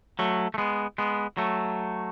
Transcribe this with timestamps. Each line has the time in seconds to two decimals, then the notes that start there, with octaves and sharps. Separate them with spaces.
0.19 F#3 A3
0.54 A3
0.58 G#3 B3
0.98 G#3 B3
1.37 F#3 A3